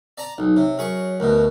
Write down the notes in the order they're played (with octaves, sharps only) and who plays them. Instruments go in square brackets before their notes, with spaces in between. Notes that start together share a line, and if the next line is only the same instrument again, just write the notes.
[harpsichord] D5 A5 A#5
[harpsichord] B1 [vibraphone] D#4
[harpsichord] C3 [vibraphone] C#5
[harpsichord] F#2 G#4 C#6
[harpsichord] D2 B2 [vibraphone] A#4